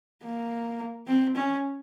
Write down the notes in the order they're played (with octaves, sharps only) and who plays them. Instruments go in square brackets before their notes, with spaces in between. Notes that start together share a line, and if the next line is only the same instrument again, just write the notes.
[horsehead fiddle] A#3
C4
C#4